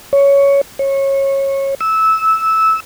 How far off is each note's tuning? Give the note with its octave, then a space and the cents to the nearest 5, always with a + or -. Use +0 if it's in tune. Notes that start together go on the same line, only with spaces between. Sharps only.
C#5 +10
C#5 -20
E6 -15